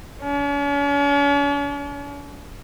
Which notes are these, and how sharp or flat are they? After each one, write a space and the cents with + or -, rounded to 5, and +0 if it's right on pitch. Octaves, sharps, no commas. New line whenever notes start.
C#4 +45